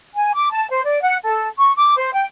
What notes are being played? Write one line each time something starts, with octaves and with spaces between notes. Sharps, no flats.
G#5
D6
A5
C5
D5
F#5
A4
C#6
D6
C5
G5